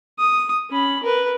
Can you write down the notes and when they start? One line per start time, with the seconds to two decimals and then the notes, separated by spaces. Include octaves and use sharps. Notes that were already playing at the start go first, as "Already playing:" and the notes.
0.18 D#6
0.70 C#4 B5
1.03 A#4 B4